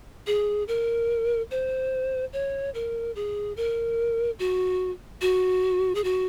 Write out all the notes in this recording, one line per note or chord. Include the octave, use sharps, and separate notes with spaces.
G#4
A#4
C5
C#5
A#4
G#4
A#4
F#4
F#4
G#4
F#4